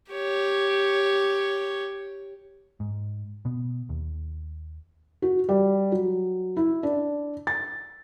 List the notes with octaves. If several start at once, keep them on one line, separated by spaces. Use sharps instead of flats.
G4 C#5
G#2
B2 B3
D#2
F#4
G3
F#3
E4
D4
A6